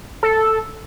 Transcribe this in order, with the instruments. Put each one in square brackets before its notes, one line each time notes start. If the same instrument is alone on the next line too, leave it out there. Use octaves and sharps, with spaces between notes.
[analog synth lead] A4